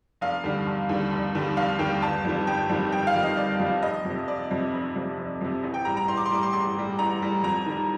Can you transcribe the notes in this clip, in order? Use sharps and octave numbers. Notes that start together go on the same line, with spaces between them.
F1 F5
D#2 D3 G3
F1
D#2 D3 G3
F1
D#2 D3 G3
F1 F5
D#2 D3 G3 G5
G1 A5
F2 D#3 G3
G1 G5
F2 D#3 G3
G1 G5
F5
F2 D#3 G3
D#5
G1 D5
F2 D#3 G3
F1 D#5
F2
C3
F1 D5
F2 C3
F1
F2 C3
F1
F2 C3
A1
G5
A2 G3 A#5
A#5
A1 C6
D6
C6
A2 G3 D6
C6
A1 C6
A2 G3
A1 A#5
A2 G3
F2 A#5
D#3 G3